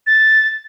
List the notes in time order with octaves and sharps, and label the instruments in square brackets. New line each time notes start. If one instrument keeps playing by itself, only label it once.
[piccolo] A6